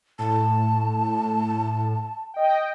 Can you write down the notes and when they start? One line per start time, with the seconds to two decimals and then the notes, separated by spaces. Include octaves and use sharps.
0.19 A2 A5
2.34 D#5 G5